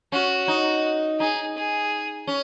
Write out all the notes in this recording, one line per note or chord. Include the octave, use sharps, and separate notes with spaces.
C#4 F#4
D#4
D#4 G#4
G#4
C#4